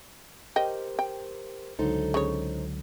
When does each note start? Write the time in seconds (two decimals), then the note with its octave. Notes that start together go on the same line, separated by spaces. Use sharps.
0.56 G4 A#4 C5 D#5 G5
0.99 G5
1.79 C#2 D3 F#3 D#4 A4 C5
2.14 C#3 C#5